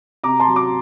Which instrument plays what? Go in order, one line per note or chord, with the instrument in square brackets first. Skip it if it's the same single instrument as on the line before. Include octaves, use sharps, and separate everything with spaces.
[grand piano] C3 A#5 D6
A5 C6
F#3
A#5 D6